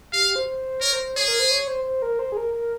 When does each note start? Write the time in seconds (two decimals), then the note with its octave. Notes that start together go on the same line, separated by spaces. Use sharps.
0.12 G4 F5
0.24 G4
0.36 C5
0.47 C5
0.81 A#4 C#5
0.93 C5
1.05 C5
1.16 G#4 C#5
1.28 A#4
1.39 C5
1.51 C#5
1.68 C5
1.85 C5
2.02 A#4
2.19 C5
2.32 G#4
2.37 A#4
2.54 A#4